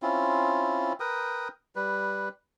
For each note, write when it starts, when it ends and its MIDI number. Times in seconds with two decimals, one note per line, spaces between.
0.02 0.93 60
0.02 0.93 61
0.02 0.93 64
0.02 0.93 65
1.00 1.48 70
1.00 1.48 71
1.00 1.48 79
1.00 1.48 87
1.76 2.29 55
1.76 2.29 71